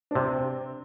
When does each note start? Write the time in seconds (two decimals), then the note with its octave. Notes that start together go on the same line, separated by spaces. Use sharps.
0.11 D4
0.15 C3 C4